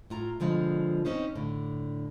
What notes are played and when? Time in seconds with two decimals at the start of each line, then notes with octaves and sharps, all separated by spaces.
0.10 A2 F4 A#5
0.40 B2 D3 F3 G#3
1.05 C4 C#4 D#4 C5
1.35 A2 D3